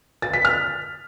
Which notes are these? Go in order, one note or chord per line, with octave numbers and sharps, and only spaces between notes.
A6
B6
F6